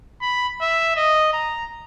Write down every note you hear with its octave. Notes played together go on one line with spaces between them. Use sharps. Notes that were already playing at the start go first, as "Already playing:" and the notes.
B5
E5
D#5
A#5